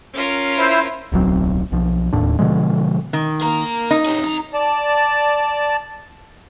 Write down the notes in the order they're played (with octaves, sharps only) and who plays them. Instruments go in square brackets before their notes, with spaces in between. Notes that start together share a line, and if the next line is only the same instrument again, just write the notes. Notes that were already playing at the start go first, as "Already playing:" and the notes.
[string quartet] C#4 F4 A#4
[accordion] E4 C5
[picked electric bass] D1 B1 F#3 C4
B1 F3
D1 D#2 A2 D4
B2 D3 F3 G#3
[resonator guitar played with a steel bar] D#3
[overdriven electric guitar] A#3 A#4
[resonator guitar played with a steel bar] D#4
[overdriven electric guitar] C#4 G4
F2 A#5
[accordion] D5 A5